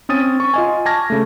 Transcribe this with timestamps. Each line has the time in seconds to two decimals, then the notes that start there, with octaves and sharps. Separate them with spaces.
0.09 C4 C#4 D#6 A6 D#7
0.36 C#4 C#6
0.54 F4 D#5 G#5
0.86 A5 C#6 D6 F6 G#6 A#6
1.10 C#3 A3